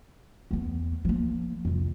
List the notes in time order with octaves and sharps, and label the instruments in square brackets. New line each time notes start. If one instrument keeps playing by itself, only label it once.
[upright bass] E2 B3
F3 A#3
C2 F2